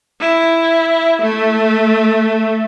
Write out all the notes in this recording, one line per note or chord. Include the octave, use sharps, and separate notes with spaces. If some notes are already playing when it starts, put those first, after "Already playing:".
E4
A3